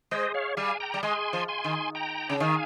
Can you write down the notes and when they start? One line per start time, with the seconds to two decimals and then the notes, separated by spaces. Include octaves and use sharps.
0.11 G#3 C5 D#5
0.34 C#5 F5
0.57 G3 F5 G#5
0.80 G5 A#5
0.94 G3
1.03 G#3 G#5 C6
1.33 F3
1.48 G#5 C6
1.64 D#3
1.95 G5 A#5
2.30 C#3
2.40 D#3 F5 G#5